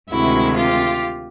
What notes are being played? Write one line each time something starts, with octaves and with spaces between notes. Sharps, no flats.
D2 C3 D#3 G#3 E4 F#4
F4 G4